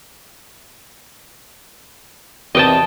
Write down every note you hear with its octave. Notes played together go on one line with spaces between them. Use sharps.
E2 C3 D#3 D#5 G5 A5